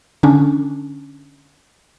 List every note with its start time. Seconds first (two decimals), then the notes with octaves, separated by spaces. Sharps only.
0.23 D3 C#4 D4